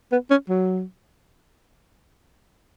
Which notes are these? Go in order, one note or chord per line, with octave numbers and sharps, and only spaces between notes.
B3
C#4
F#3